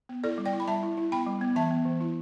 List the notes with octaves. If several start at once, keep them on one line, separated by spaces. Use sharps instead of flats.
B3
E4 A4 D5
G3
D5 G5
E4
B5
G3 E5 A5
E4
E4
B3 G5 B5
G3
B3
E3 E5 A5
B3
E3
E4